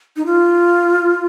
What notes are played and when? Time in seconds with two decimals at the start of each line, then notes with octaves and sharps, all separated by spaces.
0.17 D#4
0.26 F4